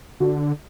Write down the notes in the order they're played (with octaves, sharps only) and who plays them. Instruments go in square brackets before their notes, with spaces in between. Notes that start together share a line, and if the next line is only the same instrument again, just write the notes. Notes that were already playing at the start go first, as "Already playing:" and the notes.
[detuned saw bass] D3 [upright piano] F#4